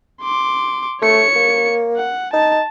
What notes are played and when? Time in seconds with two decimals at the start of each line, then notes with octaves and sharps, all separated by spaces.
0.21 C6 D6
1.02 A3 C#5 C#7
1.35 A#3
1.97 F#5
2.33 D#4 A5